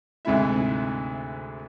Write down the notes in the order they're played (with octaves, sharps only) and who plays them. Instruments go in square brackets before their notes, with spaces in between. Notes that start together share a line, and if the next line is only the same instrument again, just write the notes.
[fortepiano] D2 G#2 C3 G#3 E4 E5